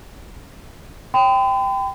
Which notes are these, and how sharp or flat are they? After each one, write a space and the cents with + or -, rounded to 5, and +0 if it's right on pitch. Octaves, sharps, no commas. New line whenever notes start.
G5 +0 B5 +45